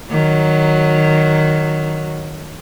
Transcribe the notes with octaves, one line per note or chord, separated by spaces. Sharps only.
D#3 F#3